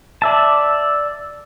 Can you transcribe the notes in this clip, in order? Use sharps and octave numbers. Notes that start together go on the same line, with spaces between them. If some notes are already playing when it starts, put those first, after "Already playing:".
D5 E5 A5